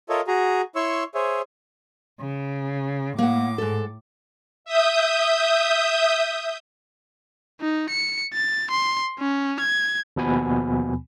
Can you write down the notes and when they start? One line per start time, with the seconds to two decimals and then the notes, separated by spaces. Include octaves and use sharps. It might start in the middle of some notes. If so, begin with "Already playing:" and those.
0.09 F4 A4 A#4 C#5 D#5 E5
0.27 F#4 G#4 A#5
0.76 E4 C#5 C6 C#6 E6
1.15 G#4 C5 C#5 E5
2.20 C#3
3.18 A2 A#3 F#5 D6
3.58 G#2 A4
4.65 E5 D#6 G6
7.61 D#4
7.90 C#7
8.34 A6
8.71 C6
9.19 C#4
9.60 G#6
10.16 D#2 B2 F3 B3 G#5 B5